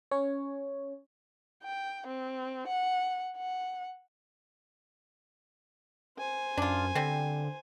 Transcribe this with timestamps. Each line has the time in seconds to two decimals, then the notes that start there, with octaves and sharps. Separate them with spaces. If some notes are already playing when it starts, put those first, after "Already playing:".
0.11 C#4 C#5
1.64 G5
2.07 C4
2.68 F#5
3.36 F#5
6.18 C5 G#5
6.58 F#2 D4 F4
6.95 D3 G3 C4